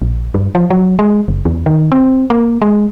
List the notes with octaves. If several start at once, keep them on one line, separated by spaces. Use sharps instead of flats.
A#1
G2
F3
F#3
G#3
F#1
E2
D#3
C4
A#3
G#3